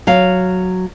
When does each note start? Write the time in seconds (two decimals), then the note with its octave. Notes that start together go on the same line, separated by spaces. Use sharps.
0.07 F#3 F5